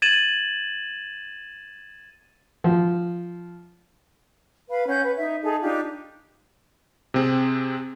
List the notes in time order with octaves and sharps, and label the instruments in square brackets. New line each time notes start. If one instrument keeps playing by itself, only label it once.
[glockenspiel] G#6 A6 D#7 E7 F#7
[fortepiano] F3
[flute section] B4 F5 B5
C#4 F#5 G6
B4
D#4 E5
D#4 G#4 A4 A5
D4 D#4 F4 G4
[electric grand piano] C3 C4 G#4